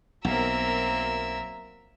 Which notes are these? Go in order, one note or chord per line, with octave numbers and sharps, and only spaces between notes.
B1 F#3 A#3 C4 A#4 E5